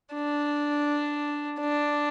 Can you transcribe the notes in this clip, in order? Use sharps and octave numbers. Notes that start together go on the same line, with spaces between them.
D4
D4